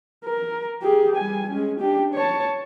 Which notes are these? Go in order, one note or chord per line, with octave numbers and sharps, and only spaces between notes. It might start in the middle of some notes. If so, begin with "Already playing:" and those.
A#4
G4 G#4
G3 G#5
G#3 C#4
D4 G4
C#5 A5